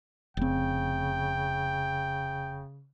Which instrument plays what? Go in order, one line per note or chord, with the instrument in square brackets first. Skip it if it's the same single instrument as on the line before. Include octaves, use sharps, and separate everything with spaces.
[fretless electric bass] F1 C4 [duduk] C#3 [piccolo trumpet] G5